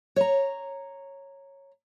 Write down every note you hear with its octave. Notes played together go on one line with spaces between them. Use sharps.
C#5 A#5